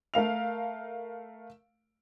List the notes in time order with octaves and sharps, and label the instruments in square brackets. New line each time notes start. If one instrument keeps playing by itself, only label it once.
[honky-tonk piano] A3 A#4 F5 F7